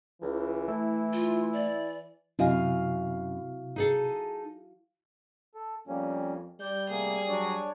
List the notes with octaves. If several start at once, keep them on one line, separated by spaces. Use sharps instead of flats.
C#2 E3
A3 E4
F4
D5
F#2 C3 E4 F#4 D#5 F5 G#5
D#4 G#4 A4
A4
F2 G3 A#3 C#4
G3 D5 G6
C3 A3 A#3 G#4
F#3 D4 C#5 D5